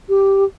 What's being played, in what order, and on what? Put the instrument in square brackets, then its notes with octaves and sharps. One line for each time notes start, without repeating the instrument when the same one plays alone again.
[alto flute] G4